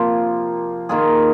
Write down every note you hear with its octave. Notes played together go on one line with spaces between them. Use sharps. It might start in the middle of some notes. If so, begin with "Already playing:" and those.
Already playing: C3 F3 A#3 F4
D#3 A#3 F4 G#4